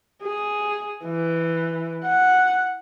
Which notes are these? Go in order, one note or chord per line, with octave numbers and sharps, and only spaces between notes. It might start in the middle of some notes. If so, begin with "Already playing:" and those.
G#4
E3
F#5